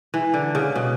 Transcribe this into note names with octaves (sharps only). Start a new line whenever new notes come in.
E3
D3
C#3
B2